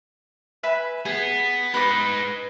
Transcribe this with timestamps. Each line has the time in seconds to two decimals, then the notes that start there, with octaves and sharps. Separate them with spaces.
0.63 B4 E5 G#5
1.05 B3 G#4
1.74 G#3 D#4 B4 D6